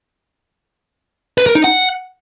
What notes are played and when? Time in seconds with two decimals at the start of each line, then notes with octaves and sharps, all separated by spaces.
1.38 B4
1.47 A#4
1.55 D#4
1.64 F#5